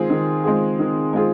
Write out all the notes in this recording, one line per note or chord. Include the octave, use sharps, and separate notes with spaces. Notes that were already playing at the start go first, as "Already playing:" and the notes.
Already playing: D#3 G#3 C4 F4 G#4
D#3
G#3 C4 F4 G#4
D#3
G#3 C4 F4 G#4